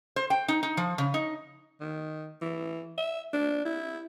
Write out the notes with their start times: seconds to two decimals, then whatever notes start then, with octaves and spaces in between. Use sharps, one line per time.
0.16 C5
0.30 G5
0.48 D#4
0.63 D#4
0.77 F3
0.98 C#3
1.14 D#4
1.81 D#3
2.41 E3
2.98 E5
3.33 D4
3.65 E4